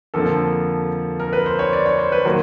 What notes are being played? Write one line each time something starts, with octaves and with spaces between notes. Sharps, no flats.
F2 D3 F3 A#3 A4
A#4
B4
C5
C#5
D5
C#5
C5
B4
D#3 F#3 A#3